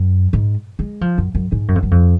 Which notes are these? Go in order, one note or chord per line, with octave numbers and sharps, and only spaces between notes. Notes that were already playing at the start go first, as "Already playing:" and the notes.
Already playing: F#2
G#2
G#3
F3
F#2
F#2
G#2
F#2
F2
F#2
F2